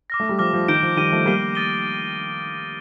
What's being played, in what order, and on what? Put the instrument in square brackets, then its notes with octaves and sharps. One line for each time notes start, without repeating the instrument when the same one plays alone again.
[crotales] D6 F6 A#6
[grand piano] A3
G3
[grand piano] F3 [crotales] D6 F6 A#6
[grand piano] F3
[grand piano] D#3 [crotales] G6 D7 G7
[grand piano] F3
[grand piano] D#3 G3 [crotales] F6 A#6 D#7 G7
[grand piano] F3 A3
[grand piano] G3 A#3 [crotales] G6 C7 D#7 G7
[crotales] D#6 A6 D#7 G7